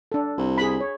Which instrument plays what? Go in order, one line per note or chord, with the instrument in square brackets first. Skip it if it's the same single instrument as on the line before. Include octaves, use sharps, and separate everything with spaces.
[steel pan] D4 A4
[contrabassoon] C2
[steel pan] G#4 B5
C#5